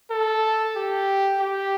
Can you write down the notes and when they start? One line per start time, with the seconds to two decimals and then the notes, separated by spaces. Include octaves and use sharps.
0.10 A4
0.76 G4
1.40 G4